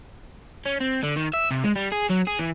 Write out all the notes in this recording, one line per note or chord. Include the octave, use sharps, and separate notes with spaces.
C#4
C4
D3
D#3
E5
C3
G#3
G3
G#4
F#3
G#4
E3